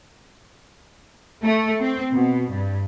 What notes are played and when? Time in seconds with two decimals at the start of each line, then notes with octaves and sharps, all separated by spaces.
1.42 A3
1.81 C4
2.12 B2
2.51 G2